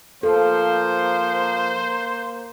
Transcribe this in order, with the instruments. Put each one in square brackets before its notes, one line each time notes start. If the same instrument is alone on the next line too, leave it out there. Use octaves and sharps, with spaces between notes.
[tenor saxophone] F3 [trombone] A#3 [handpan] A4 [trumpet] C5